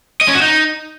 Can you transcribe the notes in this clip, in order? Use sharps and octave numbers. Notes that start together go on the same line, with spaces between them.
D#5
C#4
F#4
D#4